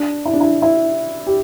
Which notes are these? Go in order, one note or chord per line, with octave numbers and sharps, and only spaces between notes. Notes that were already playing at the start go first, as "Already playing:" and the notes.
Already playing: D4
E4
D4
E4
E4
G4